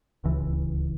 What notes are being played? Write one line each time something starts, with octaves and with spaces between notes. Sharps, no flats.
D1 C#2 E3